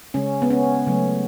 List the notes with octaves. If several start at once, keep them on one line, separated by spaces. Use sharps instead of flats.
C#3 G#3 C#4
B3
C#4
C#3 F#3 A3